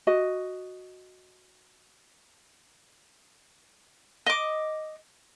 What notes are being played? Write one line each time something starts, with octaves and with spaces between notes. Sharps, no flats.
F#4 D#5
D#5 D6